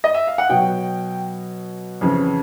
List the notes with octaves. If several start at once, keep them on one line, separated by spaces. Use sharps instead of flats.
D#5
E5
F5
F#5
B2 F#3 G5
F2 C#3 E3